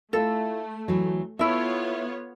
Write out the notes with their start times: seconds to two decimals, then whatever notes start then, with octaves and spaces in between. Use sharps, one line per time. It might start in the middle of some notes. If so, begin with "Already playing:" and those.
0.13 A3 E4 F4 A4 E5
0.88 D2 E3 F#3
1.39 B3 E4 F4 A4 C#5 E5